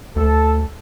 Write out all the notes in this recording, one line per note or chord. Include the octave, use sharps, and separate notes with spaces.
D2 A4